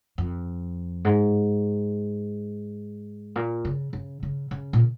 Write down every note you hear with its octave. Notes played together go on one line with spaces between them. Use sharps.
F2
G#2
A#2
C#3
C#3
C#3
C#3
A#2